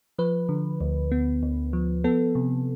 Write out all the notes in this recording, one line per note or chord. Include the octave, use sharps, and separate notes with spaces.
F3 B4
D3
D2
B3
D2
F3
B3 A4
C3